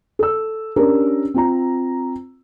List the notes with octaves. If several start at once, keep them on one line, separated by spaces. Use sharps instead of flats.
A4 E6
C#4 D4 G4 A#4
C4 F4 A#5